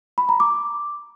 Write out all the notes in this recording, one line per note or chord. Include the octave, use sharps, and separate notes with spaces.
B5
A#5
D6